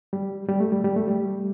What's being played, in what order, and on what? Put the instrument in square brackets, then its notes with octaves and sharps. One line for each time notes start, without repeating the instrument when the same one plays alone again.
[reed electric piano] G3
G3
A3
G3
G3
A3
G3